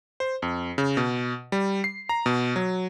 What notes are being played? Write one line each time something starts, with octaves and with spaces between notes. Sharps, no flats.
C5
F2
C#3
B2
G3
C7
A#5
B2
F#3